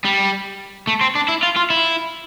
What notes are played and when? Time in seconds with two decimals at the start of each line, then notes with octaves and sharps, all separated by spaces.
0.04 G3
0.87 A3
1.01 C4
1.15 D4
1.28 E4
1.43 F4
1.56 F4
1.70 E4